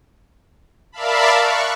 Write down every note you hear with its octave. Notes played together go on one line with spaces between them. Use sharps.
A#4 D5 E5 F5 A5 B5
C#6 F#6